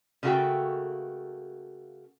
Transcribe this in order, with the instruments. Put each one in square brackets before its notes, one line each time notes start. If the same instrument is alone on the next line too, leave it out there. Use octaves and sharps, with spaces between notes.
[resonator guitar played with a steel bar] C#3 A3 A#3 F#4 A4 G5